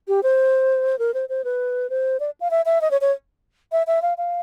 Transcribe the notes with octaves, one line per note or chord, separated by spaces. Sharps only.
G4
C5
A#4
C5
C5
B4
C5
D5
F5
E5
E5
D#5
C#5
C#5
E5
E5
F5
F5